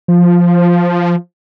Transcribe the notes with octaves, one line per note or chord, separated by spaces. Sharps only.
F3